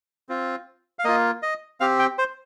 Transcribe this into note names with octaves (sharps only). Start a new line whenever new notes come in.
C4 F4
F5
A#3 F4 D#5
D#5
C4 G4 F5
G5
C5